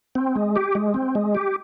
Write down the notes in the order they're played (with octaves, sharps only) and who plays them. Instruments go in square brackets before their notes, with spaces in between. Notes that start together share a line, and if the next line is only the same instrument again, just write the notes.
[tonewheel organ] C4
G#3
G4
G#3
C4
G#3
G4